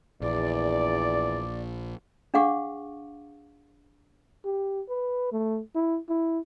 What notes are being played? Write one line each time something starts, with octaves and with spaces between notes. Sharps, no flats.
A#1 E2 D5
D4 G#4 F5 F#5 C#6 D6
G4
B4
A3
E4
E4